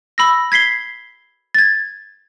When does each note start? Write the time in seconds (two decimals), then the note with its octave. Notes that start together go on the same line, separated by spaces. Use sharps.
0.18 B5 E6 A#6
0.52 G#6 B6 C7 G7
1.54 G#6 A6